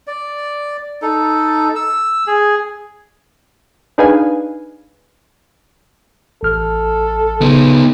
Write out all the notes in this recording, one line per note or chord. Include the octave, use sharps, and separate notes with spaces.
D5
D#4 A4
E6
G#4
D4 D#4 G#4 B4 F5 G#5
A1 A4 F6
C#3 B3 D#4